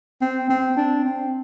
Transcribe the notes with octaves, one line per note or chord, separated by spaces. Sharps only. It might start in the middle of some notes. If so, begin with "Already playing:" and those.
C4
C4
D4
C4